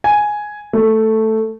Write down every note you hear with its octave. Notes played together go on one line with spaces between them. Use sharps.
G#5
A3